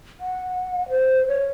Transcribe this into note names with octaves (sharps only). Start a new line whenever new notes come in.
F#5
C5
C#5